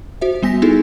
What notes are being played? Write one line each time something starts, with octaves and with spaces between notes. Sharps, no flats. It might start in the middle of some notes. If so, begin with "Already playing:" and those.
F#4 C5 E5
G3 B3 G#5 A#6 B6
B3 D#4 E4 G#4 A4